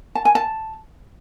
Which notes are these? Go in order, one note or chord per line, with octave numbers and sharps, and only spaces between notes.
A5
G#5
A5